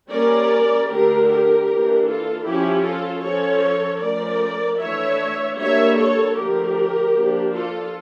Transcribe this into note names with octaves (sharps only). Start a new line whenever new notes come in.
G3 A#3 C#4 A#4 D5
D3 A3 D4 G4 A#4
G4 A#4
E3 A#3 D4
F4 A4
F3 C#4 E4 G4
F4 A4
F3 C#4 A4 C#5
F3 A3 C#4 A#4 D5
E3 A3 D4 C#5 E5
G3 A#3 D4 C#5 E5
A4 C#5
D3 F3 A3 G4 A#4
F3 A#3 D4
F4 A4